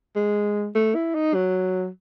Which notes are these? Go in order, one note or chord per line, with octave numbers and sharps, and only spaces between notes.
G#3
A3
E4
D#4
F#3